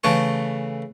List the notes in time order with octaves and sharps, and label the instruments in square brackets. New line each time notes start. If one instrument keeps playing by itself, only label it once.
[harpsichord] C#3 E3 A3 G#5 C#6